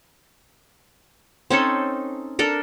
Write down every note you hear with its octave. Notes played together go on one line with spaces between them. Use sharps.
C4 C#4 D#4 A4
D4 A4 A#4